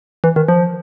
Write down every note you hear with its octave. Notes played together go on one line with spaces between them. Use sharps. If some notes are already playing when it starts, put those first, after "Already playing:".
E3
D#3
F3